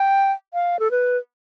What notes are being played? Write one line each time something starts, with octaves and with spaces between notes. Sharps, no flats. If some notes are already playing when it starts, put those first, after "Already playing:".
Already playing: G5
F5
A4
B4